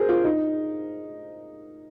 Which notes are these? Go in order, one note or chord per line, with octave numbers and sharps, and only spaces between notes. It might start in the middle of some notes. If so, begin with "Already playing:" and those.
Already playing: G#4 A#4 C5
F4
D#4